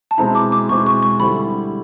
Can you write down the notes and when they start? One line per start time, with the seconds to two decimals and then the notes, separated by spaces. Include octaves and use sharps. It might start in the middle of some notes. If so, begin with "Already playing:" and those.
0.11 A5
0.18 B2 G#3 C4 E4 A#5
0.35 D6
0.52 D6
0.68 B2 G#3 C4 E4 C#6
0.86 C#6
1.03 C#6
1.19 D3 G3 C4 E4 B5